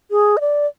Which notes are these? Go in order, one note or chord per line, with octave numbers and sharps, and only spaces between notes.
G#4
D#5
D5